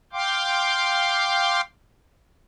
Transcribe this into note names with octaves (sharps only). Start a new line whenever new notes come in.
F5 G5 C6 D6